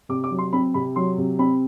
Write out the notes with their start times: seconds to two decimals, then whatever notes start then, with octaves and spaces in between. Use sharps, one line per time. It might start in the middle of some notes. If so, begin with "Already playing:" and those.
0.09 C3 D6
0.24 D6
0.31 F#3
0.39 C6
0.53 C4 B5
0.74 C3 B5
0.96 F#3 C6
1.18 C3
1.39 C4 B5